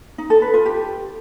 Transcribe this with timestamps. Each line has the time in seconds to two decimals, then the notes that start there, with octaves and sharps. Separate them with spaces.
0.18 D#4
0.30 A4
0.42 B4
0.54 F4
0.66 G4